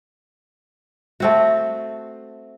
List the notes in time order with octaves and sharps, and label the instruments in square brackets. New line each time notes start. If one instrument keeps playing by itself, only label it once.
[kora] A3 C4 F#4